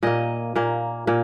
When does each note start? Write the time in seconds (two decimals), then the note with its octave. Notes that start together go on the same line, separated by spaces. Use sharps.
0.03 A#2 A#3 D#5
0.56 A#2 A#3
1.07 A#2 A#3